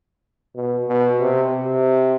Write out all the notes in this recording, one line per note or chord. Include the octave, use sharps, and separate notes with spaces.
B2
B2
C3
C3